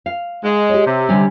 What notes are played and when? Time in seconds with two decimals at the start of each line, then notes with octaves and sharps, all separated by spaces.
0.06 F5
0.43 G#3
0.69 G4 C#5
0.86 C3
1.09 D3 G3 C#4